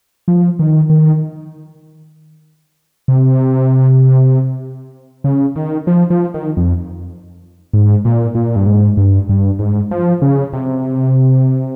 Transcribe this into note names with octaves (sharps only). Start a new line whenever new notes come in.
F3
D#3
D#3
C3
C#3
D#3
F3
F3
D#3
F2
G#2
A#2
A#2
G2
G#2
G2
G2
G#2
F3
C#3
C3